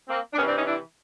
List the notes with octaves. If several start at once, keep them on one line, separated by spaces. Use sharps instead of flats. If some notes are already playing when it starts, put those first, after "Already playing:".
A#3 C4
D4
C3 E3 B3 C#4
C4 D4
C#4 D#4
D4 E4